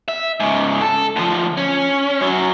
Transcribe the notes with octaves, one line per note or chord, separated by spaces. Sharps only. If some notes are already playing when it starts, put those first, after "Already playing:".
E5
G#2 C#3
A4
D2 F3
C#4
F#2 F#3